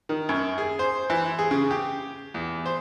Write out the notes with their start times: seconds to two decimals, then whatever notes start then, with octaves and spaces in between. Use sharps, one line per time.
0.09 D#3
0.29 F#2
0.58 G#4
0.79 C5
1.10 E3
1.39 G#4
1.51 C#3
1.71 G4
2.34 E2
2.66 C5